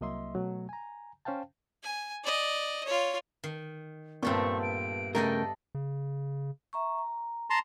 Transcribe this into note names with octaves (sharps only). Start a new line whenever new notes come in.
C2 F#3 A#3 D#5 E5 C6
B2 F#3 A3
G#5 A#5
C#4 C5 F5 G5 A5
G#5
D5 D#5
F4 C#5
D#3
G2 A#2 A3 B3 C4 C#6
D7
C#3 A3 D4 A4 A#4 D#5 G5
C#3
E5 A#5 C#6
A#5
A5 A#5 C6